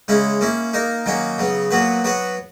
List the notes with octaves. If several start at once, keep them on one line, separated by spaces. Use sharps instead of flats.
C#3 G#3 C#4 E4
A#3 C#4 E4
A#3 D#4 A#4
D#3 F#3 A#3 C#4
C#3 F#3 B3
A#2 F#3 B3 F#4 B4
F#3 B3 F#4 B4